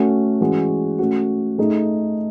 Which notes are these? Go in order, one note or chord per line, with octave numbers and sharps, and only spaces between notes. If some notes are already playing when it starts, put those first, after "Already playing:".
Already playing: A3 C#4 F#4
E3 G#3 C#4 F#4
A3 C#4 F#4
A3 D#4 G#4